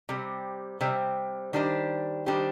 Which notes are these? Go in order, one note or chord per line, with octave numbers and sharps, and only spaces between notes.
C3 G3 C4
C3 G3 C4
D#3 G3 D4 G4 C5
D#3 G3 D4 G4 C5